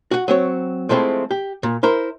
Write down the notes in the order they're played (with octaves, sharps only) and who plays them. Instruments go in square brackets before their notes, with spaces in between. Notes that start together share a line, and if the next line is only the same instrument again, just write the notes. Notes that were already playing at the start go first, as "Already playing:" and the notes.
[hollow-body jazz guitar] F#4 F#5
F#3 C4 C#5
F3 G#3 A3 C4 E4
G4
A#2
E4 A#4 C5